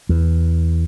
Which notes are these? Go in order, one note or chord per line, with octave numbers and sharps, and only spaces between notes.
E2